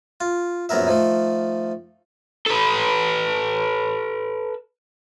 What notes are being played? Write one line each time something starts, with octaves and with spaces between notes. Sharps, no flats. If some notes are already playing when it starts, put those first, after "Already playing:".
F4
A#1 F#2 B3 A#4 E5
D#3 F3 A3
A4 B4